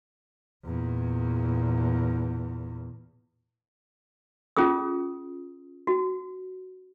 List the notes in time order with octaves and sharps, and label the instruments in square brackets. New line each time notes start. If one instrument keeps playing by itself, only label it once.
[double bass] E2 A#2
[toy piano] C#4 F4 G#4 D#6
F#4